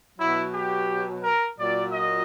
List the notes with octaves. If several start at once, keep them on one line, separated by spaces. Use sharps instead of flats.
B2 F#3 E4
G4
A#4
A#2 F#3 D5
D#5